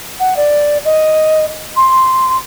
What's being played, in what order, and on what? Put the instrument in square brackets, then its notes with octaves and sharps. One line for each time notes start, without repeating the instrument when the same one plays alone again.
[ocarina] F#5
D5
D#5
C6